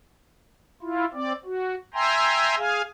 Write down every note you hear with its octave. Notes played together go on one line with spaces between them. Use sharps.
E4 F4
C4 D5
F#4
E5 G5 G#5 A#5 C6
G#4 F5 G#5